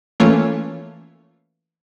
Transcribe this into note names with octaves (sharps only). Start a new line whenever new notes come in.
E3 A3 A#3 C#4 F4 C#5